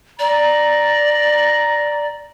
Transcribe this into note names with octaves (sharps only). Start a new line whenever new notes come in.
D5 A#5